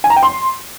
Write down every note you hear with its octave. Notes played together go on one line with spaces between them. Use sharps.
G#5
A#5
G5
C6